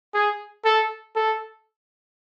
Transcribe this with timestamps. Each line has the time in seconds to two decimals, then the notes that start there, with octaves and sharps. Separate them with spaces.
0.14 G#4
0.65 A4
1.16 A4